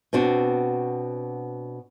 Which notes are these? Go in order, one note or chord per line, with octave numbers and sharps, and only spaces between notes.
B2 C4 D4 F#4